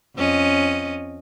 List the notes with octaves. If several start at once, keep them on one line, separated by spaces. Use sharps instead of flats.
F2 C#4 D#5